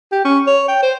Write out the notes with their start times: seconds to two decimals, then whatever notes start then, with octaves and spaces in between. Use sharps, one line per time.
0.12 G4
0.25 C#4
0.47 C#5
0.68 G5
0.82 C5